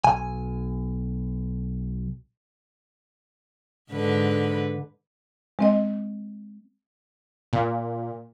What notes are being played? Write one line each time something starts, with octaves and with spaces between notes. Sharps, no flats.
B1 G#5
G#2 D3 B4
G#3 C4 D#5
A#2